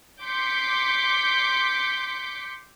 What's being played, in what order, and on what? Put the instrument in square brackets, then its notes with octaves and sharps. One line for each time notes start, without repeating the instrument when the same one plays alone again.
[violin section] C6 D6 G6 B6 C#7